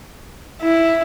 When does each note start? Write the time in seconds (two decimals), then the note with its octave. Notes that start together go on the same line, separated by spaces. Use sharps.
0.62 E4